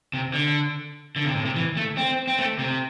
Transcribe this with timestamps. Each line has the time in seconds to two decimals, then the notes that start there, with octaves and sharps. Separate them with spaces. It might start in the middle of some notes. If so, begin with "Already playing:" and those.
0.13 C3
0.34 D3
1.16 D3
1.25 C3
1.36 A2
1.45 C3
1.56 E3
1.77 A3
1.97 C4
2.27 C4
2.39 A3
2.59 C3